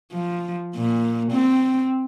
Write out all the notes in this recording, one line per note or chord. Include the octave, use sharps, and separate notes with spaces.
F3
A#2
C4